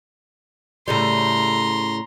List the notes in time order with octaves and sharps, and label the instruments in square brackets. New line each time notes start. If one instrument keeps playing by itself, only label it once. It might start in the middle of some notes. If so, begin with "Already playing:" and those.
[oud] A2 C#3 G3 [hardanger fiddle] A#5 C6